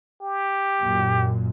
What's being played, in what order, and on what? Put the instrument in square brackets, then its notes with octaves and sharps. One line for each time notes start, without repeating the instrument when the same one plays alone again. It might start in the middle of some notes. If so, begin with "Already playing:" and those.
[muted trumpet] G4
[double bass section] F#2 A#2